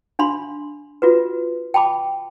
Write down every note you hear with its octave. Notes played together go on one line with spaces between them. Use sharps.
D4 F5 B5 C6
F4 F#4 B4
G5 A5 B5 D6